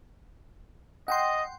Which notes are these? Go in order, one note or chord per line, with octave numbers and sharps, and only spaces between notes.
D#5 F#5 G5 C6